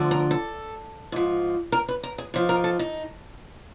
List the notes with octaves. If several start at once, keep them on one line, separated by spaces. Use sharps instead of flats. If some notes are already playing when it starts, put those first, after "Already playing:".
Already playing: D2 D3 F3
A#4
A4
G#2 F3
A#4
B4
A#4
G#4
G#2 F3
A#4
A4
D#4